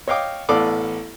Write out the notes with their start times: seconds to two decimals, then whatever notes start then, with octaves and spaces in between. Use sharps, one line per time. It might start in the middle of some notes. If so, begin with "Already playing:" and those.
0.08 C#5 D#5 F5 G5 D6
0.49 A1 B3 A4 D5 F5 D6